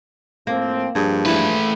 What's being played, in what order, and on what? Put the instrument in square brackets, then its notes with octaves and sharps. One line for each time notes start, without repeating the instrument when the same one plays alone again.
[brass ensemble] A2 F3 C4 [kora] A#3
[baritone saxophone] G2 [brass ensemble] F3 [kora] G#4
[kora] E3 [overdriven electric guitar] A3 B4